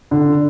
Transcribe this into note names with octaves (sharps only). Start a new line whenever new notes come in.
D3